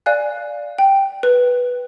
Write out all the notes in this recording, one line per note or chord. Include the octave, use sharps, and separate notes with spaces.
D5 F5 G#5 F#6
G5
B4